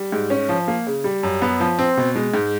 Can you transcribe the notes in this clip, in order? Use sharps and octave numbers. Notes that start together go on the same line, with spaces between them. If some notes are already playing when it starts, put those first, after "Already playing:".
Already playing: G3
G#2
C#4
F3
A#3
C#3
G3
F#2
B3
F3
C4
B2
G#3
G#2